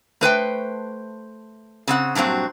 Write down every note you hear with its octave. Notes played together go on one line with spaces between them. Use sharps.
A3 B4 C5 G5
C#3 C4 F#5
G2 A#2 F#3 C4 F#4